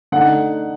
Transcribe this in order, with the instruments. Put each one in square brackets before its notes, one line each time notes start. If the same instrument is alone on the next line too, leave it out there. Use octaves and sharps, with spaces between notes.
[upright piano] D3 A3 D#4 F#5